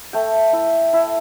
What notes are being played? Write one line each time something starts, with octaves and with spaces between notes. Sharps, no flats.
A3 G5
E4
E4